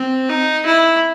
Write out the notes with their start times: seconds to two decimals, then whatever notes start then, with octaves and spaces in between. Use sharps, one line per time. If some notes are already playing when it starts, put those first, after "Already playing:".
Already playing: C4
0.29 D#4
0.66 E4